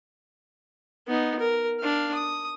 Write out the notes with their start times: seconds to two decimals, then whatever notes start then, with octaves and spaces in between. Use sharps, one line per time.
1.08 B3 D#4
1.39 A#4
1.81 D4 F5
2.15 D#6